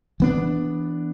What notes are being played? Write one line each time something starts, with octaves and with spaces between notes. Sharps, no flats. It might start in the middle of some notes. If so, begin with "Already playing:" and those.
E3 B3 D4